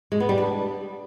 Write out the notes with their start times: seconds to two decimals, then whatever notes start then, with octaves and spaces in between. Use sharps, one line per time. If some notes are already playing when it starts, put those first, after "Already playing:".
0.12 G#3
0.20 B3
0.29 G3
0.38 D4